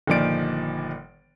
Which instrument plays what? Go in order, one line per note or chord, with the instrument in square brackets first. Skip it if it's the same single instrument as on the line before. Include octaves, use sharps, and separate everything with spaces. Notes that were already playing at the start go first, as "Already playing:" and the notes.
[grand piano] G1 A#2 D#3 F3 D5 D7